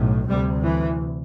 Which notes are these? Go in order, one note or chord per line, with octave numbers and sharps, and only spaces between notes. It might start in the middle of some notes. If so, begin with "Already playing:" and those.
Already playing: B1 A2
D2 C3 G3
E3